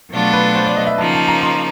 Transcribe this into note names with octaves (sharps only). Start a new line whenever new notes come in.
B2 F#3 A3 D4 F4
B4
C5
D5
D#5
E5
C#3 F3 A#3 D#4 A5
A5
A#5
C6